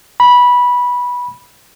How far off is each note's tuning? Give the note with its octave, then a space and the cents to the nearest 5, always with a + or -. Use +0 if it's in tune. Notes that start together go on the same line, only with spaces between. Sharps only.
B5 -15